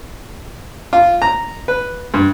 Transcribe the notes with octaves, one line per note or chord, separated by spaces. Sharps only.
F4
A#5
B4
G2